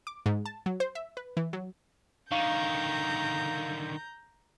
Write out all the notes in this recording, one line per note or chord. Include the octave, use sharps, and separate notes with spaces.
D6
G#2
A5
F#3
C5
E5
B4
E3
F#3
D3 D#3 F5 A#5 C#6 G6